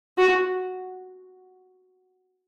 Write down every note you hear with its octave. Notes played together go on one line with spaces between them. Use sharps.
F#4